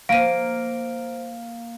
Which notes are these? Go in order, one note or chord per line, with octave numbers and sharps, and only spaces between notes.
A#3 C5 F5 D7 D#7